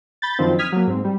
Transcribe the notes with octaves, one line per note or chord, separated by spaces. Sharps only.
B5 G6 A6
F#2 D3 D#3 F3 C4
D#6 F6 G#6 B6
F#3 A#3
G#2 C4
G3